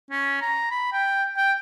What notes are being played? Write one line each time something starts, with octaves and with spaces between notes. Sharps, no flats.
C#4
A#5
B5
G5
G5